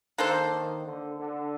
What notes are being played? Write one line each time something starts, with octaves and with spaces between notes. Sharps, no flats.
D#3 A#3 D4 A4 C5
D#3
D3
D3